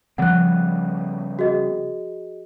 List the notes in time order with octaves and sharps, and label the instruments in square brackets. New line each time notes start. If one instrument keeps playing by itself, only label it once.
[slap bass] C#3 G3 B3 [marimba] F3 [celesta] F#5 F#6
[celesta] F#4 G#4 D#5